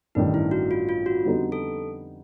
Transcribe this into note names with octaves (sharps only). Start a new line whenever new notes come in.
A1 G2 D#3 D#4
E4
F#4
F4
F4
F#4
F2 D3 G3 B3 D#4
A4